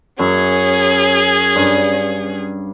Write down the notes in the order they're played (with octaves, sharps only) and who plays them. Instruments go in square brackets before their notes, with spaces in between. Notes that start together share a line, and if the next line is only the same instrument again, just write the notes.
[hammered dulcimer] F#2 [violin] C#4 G#4
[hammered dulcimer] G2